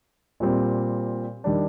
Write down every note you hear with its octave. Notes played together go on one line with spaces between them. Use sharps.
A#2 G3 C4
D#3 G3 D4